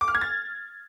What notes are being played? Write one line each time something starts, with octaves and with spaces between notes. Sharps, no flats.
D6
F6
G#6
A6